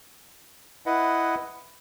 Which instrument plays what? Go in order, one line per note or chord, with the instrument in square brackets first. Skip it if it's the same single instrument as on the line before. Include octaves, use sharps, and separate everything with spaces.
[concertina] E4 B4 D#5 F#5